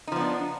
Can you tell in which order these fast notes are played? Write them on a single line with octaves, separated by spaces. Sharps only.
D#4 F3 B3 D4